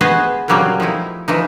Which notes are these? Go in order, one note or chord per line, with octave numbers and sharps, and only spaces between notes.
B3 F#4 G#4 B4 C5 D#5
A#2 C#3 F#3 G3 A#3 C4
F3 A3 D#4 E4
E3 F3 D#4